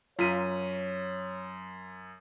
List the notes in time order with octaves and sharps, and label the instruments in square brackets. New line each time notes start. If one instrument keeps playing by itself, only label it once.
[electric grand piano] F#2 B6 D#7 [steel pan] F4 A#5 [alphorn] C#5